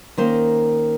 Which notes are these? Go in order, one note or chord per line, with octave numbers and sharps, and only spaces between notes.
D#3 A#3 C#4 C5